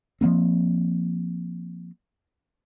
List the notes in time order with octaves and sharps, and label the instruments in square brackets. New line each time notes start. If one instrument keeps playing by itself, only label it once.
[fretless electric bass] F3 F#3 A#3 C4